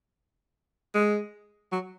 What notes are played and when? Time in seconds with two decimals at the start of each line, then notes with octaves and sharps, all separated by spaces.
0.94 G#3
1.72 F#3